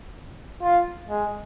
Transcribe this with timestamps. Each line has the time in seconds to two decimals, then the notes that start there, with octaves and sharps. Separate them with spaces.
0.63 F4
1.09 G#3